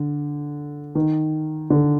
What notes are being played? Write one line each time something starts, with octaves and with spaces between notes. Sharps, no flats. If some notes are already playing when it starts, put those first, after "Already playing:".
Already playing: D3
D#3
D3